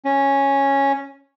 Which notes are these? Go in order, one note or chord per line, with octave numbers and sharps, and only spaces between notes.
C#4